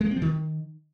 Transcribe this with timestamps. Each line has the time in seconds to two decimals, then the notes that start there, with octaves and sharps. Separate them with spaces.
0.01 G#3
0.06 A#3
0.11 C4
0.16 F3
0.22 D#3